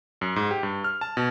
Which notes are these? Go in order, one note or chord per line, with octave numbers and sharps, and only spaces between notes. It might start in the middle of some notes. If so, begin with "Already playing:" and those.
F#2
G#2
G4
G2
F6
A5
B2